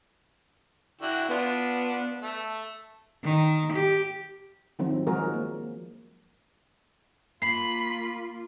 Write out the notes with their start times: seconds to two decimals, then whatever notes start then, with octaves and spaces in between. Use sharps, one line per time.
1.01 D3 E4 F#4 G5
1.29 B3 D4 F4
2.21 A3
3.24 D#3
3.72 G4
4.79 D#3 F3 F#3 C4 D4
5.07 F3 G#3 F#4 G#4 A#4
5.34 A#3
7.42 A#3 F4 B5 C7